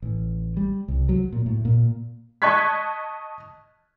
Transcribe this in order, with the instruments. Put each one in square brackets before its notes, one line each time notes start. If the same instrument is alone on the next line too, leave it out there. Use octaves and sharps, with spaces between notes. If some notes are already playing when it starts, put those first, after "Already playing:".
[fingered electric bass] A1
G3
C2
F#3
A#2
A2
A#2
[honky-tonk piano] D#5 A5 C#6 F#6 G#6 B6